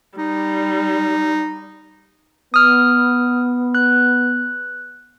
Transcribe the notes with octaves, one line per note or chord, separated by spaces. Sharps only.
G3 D#4
B3 D#6 F6
F#6